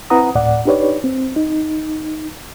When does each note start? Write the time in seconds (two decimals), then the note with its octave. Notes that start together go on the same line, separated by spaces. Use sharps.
0.10 C4 E4 B4 F#5 A#5 D#6
0.35 D2 A2 D5 F#5
0.65 D4 D#4 G4 B4 C#5 D5
1.04 C4
1.36 D#4